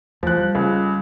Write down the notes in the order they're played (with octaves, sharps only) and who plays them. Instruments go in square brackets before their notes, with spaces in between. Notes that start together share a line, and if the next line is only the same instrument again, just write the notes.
[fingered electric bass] E2 E3 [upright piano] F3 F#6
[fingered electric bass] G3
[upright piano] C#2